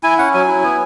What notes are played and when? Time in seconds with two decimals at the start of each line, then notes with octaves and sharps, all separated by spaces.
0.03 E4 G#5
0.18 C#4 F#5
0.34 F#3 G#5
0.48 E4
0.64 B3